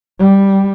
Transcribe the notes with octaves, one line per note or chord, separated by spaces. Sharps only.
G3